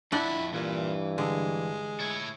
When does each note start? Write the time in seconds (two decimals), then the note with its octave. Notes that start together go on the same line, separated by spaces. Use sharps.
0.12 F2 D4 E4 F#5 B5
0.53 G2 A#2 E3
1.18 D3 G#3
2.00 E4 C#5